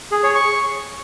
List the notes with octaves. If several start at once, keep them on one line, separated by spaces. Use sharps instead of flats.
G#4
C#5
C#6